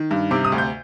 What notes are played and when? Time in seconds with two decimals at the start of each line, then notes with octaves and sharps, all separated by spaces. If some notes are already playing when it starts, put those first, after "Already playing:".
Already playing: D#3
0.11 G2
0.31 C3 D6
0.45 D#6
0.52 D2
0.58 G6